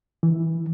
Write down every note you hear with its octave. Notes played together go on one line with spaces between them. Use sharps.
E3